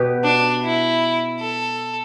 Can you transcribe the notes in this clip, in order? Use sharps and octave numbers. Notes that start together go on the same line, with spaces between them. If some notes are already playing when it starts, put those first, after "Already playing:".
Already playing: B2 B3 G4 B4
D4
E4
A4